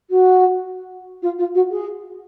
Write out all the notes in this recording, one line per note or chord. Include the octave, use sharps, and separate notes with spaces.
F#4
F4
F4
F#4
G#4